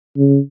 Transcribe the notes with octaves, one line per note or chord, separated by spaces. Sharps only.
C#3